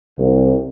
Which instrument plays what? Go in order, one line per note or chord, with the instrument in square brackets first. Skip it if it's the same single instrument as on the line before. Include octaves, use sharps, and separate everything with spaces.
[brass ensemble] C2